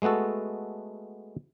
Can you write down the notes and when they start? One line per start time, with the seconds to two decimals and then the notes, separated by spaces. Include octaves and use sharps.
0.02 G#3 A3 B3 F#4 A4